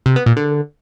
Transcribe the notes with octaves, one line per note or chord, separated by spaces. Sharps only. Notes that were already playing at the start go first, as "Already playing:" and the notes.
C3
B3
A#2
D3